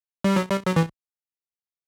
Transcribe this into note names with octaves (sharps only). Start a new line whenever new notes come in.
G3
F#3
G3
F#3
E3